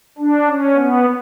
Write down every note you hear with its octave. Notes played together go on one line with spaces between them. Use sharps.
D4
C#4
B3